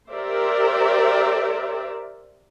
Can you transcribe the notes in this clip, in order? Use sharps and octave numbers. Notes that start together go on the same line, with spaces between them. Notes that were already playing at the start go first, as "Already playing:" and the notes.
G4 A#4 C5 D5 E5